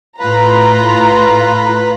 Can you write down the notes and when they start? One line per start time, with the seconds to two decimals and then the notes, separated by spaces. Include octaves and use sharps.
0.20 A2 F4 B4 A#5